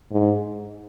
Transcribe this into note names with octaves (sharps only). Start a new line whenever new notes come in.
G#2